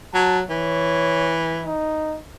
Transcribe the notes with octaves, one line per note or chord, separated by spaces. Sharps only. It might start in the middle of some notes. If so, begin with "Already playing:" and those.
F#3 A5
E3 C#5
D#4